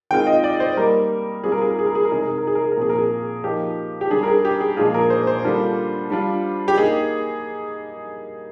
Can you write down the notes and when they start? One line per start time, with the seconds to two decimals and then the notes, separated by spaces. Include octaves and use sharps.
0.11 D#3 G#3 C4 F4 G5
0.27 D#5
0.44 D5
0.60 C5
0.77 G3 A#3 D#4 A#4
1.44 G3 C4 F4 G#4
1.52 A#4
1.62 G#4
1.69 A#4
1.79 G#4
1.86 A#4
1.95 G#4
2.04 A#4
2.10 C3 D#3 G#3 G#4
2.21 A#4
2.30 G#4
2.38 A#4
2.47 G#4
2.55 A#4
2.64 G#4
2.72 A#4
2.77 A#2 F3 C4 G#4
2.90 A#4
2.98 G#4
3.44 F3 A#3 D#4 G4
4.01 G4
4.10 D3 G3 D4 G#4
4.23 A#4
4.28 G#4
4.45 G4
4.60 G#4
4.77 A#2 F3 G#3 D4 F4 G#4
4.94 A#4
5.10 C5
5.27 C5
5.45 D3 G3 A#3 D4 F4
6.10 G3 D4 F4
6.68 G4
6.77 A#3 D#4 G#4